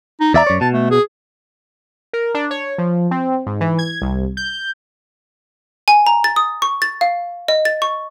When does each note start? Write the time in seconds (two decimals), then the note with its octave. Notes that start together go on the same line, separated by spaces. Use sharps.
0.20 D#4
0.34 E2 D5 E5 A#5
0.47 F#2 C#5
0.61 B2 A5
0.73 A3
0.91 G#4
2.13 A#4
2.34 D4
2.51 C#5
2.78 F3
3.11 C4
3.47 G#2
3.61 E3
3.79 G#6
4.02 C2
4.37 G6
5.88 G#5
6.07 A#5
6.24 A6
6.36 D#6
6.62 C#6
6.82 A6
7.01 F5
7.48 D#5
7.65 A6
7.82 C#6